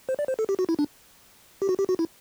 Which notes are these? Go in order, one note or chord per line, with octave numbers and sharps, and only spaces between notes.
C5
D5
C5
A4
G4
F#4
E4
D4
G4
F#4
G4
F#4
E4